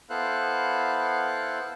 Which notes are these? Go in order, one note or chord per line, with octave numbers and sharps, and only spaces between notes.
B3 E4 A4 C5 F5 F#6